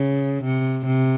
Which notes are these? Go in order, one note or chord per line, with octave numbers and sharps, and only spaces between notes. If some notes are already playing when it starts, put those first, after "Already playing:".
Already playing: C#3
C3
C3